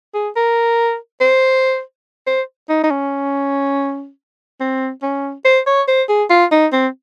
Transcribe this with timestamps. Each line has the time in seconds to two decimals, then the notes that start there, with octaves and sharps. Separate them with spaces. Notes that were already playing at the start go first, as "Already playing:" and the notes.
0.14 G#4
0.36 A#4
1.21 C5
2.27 C5
2.69 D#4
2.84 D#4
2.91 C#4
4.60 C4
5.02 C#4
5.45 C5
5.67 C#5
5.88 C5
6.09 G#4
6.30 F4
6.52 D#4
6.73 C4